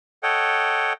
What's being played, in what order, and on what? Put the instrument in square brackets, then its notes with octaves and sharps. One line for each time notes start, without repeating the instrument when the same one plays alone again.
[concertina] A4 C#5 D#5 F#5 G5